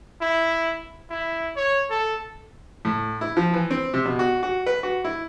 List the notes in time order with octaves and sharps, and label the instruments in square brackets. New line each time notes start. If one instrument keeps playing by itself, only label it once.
[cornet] E4
E4
C#5
A4
[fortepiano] A2
E4
F3
E3
C4
C3
B2
F#4
F#4
B4
F#4
E4